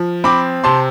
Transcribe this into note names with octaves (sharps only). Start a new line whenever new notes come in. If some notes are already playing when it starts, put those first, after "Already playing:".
Already playing: F3
C4 B5 D6
C3 A5 C6